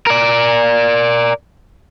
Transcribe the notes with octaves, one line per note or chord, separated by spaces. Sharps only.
A#4 D5